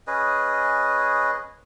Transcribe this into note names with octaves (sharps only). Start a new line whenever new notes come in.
C#4 G#4 B4 D#5